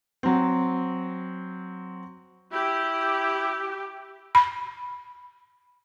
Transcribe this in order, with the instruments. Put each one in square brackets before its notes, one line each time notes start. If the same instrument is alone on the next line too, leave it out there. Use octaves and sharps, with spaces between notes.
[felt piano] F#3 C4
[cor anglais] E4 [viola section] G4
[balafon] B5